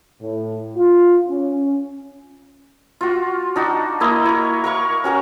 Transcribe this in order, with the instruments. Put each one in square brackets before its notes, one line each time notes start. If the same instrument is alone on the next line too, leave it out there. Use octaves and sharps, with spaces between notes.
[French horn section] A2
F4
C#4
[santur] F4 F#4
D4 D#4 F#4
A#3 E4 D#5 A#5
A#4 C#5
A#4 F5 C#6
C#4 F#4 A#4 A#5